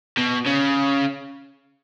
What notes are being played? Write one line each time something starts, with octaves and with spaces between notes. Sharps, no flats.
B2
C#3